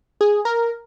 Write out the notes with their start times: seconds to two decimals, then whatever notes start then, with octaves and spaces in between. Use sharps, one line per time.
0.21 G#4
0.45 A#4